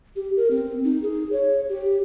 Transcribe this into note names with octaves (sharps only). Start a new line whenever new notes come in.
G4
A#4
C4
D#4
G#4
C#5
G4